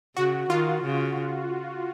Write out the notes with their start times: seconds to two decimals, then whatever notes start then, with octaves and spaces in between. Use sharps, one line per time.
0.16 C#3 F#4
0.50 D#3 F4
0.84 C#3